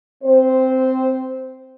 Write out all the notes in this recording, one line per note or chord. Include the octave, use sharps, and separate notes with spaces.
C4 C5